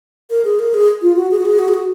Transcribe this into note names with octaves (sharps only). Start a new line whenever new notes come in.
A#4
G#4
A#4
G#4
F4
F#4
G#4
F#4
G#4
F#4
G#4
F#4